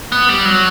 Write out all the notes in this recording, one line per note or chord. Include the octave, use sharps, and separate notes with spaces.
B3
G3
F#3